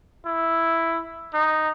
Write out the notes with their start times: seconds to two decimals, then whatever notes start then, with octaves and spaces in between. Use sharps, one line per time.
0.26 E4
1.34 D#4